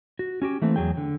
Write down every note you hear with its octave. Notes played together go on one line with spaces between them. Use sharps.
F#4
C#4 F#4 G4
E3 A3 A#3 C4
E2 F#3 G#4 G5
D3